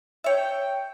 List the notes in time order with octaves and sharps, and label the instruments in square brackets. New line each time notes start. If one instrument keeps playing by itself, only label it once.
[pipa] C#5 E5 [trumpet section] G5